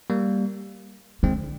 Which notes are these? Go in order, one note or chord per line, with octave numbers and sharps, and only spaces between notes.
G3 A#3
D3 G#3 C4